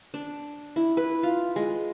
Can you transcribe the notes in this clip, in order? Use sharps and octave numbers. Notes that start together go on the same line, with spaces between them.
D4
E4
B4
F4
G#3